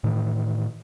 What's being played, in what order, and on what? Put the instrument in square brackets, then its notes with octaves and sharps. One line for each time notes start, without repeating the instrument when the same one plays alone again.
[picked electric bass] A2 D#3 E3